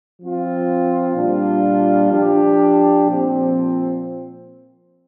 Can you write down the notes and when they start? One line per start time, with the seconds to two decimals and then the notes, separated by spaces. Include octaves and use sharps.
0.21 F3 C4 F4
1.16 A#2 G3 D4 F4
2.12 F3 D4 G4
3.08 A#2 F3 C4